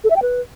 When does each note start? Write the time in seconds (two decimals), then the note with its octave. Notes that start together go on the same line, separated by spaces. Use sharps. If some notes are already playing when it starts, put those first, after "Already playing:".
0.04 A4
0.10 E5
0.16 G5
0.22 B4